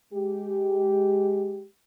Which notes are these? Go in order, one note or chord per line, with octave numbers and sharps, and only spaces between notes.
G#3 G4